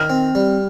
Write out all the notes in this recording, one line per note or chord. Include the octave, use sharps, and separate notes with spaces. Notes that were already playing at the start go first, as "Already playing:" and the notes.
Already playing: D#3 F6
C4
G3